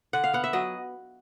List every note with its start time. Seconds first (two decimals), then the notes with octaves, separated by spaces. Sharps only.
0.13 D3 F#5
0.24 F5
0.33 B3 F#5
0.44 E5
0.53 F#3 D#5